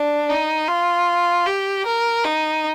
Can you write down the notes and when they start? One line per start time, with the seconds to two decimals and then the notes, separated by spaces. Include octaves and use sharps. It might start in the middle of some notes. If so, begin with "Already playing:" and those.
Already playing: D4
0.29 D#4
0.68 F4
1.46 G4
1.86 A#4
2.25 D#4